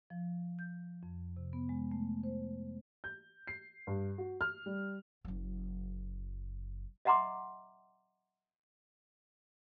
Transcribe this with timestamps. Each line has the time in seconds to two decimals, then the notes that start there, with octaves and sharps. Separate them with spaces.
0.10 F3
0.59 G6
1.03 F2
1.37 C3
1.53 B3
1.69 G#3
1.92 A3
2.23 C5
3.04 G6
3.47 C7
3.87 G2
4.18 F#4
4.41 F6
4.66 G3
5.25 F#1 F#3
7.05 D#5 E5 F#5 A#5 C6 D6